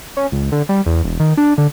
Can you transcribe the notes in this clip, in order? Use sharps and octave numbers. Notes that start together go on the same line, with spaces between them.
C#4
C#2
D3
G3
E2
E1
D#3
D4
D3